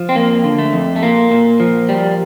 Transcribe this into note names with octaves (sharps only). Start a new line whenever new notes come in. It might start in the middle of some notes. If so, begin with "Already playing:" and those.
Already playing: F3
C4
F2 A#3
D3
A3
F2
A3
A#2 A#3
A#2
F3
G3